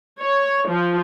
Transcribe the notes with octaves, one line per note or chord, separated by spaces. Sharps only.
C#5
F3